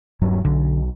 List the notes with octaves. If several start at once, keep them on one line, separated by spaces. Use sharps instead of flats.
D#1 G2 F#3
B1 D3